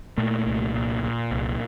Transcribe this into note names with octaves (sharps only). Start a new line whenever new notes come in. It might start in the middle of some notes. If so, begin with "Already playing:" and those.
A#2 A3
C2
A#2
A#2
C2